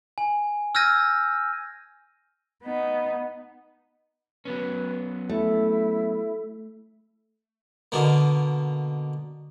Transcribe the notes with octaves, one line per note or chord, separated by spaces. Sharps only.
G#5
E6 F6 G6 G#6 A#6 D#7
B3 D#4
F#3 B3 C#4 B4
A3 E4
B2 D3 A#3